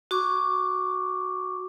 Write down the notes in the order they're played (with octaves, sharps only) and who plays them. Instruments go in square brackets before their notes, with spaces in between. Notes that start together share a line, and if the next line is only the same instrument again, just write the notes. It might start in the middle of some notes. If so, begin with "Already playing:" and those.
[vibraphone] F#4 C#6 D6